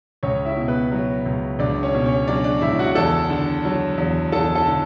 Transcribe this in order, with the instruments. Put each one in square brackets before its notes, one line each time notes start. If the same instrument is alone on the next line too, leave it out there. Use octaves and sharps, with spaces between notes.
[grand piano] C#2 C#4 C#5
E4 E5
B2
B3 B4
F#3
C#2
C#2 D4 D5
C#4 C#5
B2
C#4 C#5
F#3 D4 D5
D4 D5
C#2 E4 E5
F#4 F#5
E2 A4 A5
D3
F#3
E2
E2 A4 A5
A4 A5
D3